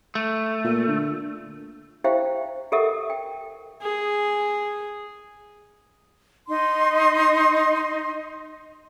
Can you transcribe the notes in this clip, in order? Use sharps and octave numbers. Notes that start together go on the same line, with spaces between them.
A3
A#2
D3
E4 G4 C5 E5 F5 G5
G4 A4 A#4 D#5 E5 F#5
G5
G#4
D#4 D#5 C6